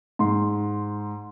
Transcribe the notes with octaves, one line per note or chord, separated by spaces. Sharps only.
G#2 C6